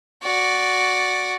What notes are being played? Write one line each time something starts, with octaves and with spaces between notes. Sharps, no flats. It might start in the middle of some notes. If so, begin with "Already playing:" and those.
F#4 D5